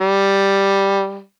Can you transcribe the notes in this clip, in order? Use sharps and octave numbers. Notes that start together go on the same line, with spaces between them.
G3